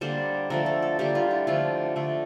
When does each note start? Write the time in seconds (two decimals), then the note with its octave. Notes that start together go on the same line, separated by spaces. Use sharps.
0.01 D3 G3 A#3 C5
0.50 D3 F3 A3 A#4
0.66 A4
0.82 A4
0.99 D3 G3 A#3 G4
1.15 F4
1.31 E4
1.47 D3 F3 A3 F4
1.96 D3 A3